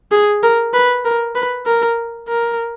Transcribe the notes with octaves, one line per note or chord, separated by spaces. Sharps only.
G#4
A#4
B4
A#4
B4
A#4
A#4